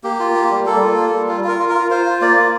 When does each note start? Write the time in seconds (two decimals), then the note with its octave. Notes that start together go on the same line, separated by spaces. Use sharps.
0.04 A#3 G4
0.20 F4
0.35 A#3
0.51 G3
0.66 A#3 A4
0.81 F4
0.97 A#3
1.13 G3
1.28 F4
1.44 F4 A#4
1.59 F4
1.69 A#4
1.75 F4
1.90 F4 C5
2.06 F4
2.21 A#3 D5
2.37 F4